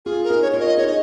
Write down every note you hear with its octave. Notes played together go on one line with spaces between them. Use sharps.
F4 G#4
A#4
D#4 G#4
C#5
F4 A#4 C#5
D#5
D#4 G#4 C#5
D#5